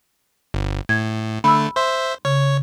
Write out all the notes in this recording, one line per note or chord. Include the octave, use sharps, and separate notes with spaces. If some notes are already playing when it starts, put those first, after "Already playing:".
G1
A2 G#6
D3 A3 B5 E6
C5 E5 C6
C#3 C#5